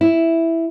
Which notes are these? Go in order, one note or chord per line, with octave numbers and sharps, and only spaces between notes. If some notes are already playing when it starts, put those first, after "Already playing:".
E4